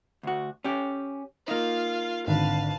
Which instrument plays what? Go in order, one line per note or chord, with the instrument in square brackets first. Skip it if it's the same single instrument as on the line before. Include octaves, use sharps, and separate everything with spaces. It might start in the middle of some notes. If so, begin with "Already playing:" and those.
[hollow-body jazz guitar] D2 F#4
C#4 G4
[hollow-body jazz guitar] A#3 D#4 [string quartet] F4 F5
[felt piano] G#1 D3 [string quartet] B4 F5 A5